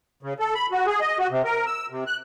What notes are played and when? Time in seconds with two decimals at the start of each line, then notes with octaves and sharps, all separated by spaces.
0.23 C#3
0.39 A4
0.55 B5
0.72 F#4
0.86 G#4
1.00 D#5
1.19 F#4
1.30 C3
1.45 A#4
1.66 E6
1.90 C3
2.07 F#6